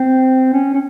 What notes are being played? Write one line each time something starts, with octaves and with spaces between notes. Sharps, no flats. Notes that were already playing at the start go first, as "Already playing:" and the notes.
Already playing: C4
C#4
C#4